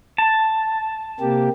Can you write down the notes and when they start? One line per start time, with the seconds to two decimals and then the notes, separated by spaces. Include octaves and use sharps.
0.18 A5
1.20 C3 A#3 G4